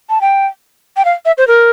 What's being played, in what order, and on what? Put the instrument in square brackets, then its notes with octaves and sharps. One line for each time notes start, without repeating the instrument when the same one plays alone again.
[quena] A5
G5
G5
F5
E5
C5
A#4